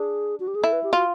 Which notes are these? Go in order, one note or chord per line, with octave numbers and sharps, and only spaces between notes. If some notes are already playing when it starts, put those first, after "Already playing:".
Already playing: D4 G#4
F#4
G4
G#4
E4 A4
B4
G4
F4 F#4